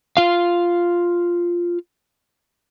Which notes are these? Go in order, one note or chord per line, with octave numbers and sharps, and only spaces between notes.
F4 F5